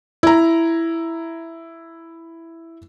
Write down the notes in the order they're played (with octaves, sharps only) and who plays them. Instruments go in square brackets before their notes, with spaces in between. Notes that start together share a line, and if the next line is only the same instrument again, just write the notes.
[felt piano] E4 A#5